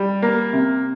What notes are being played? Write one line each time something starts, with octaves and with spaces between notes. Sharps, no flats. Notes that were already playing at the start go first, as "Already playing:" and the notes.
Already playing: G3
A#3
C3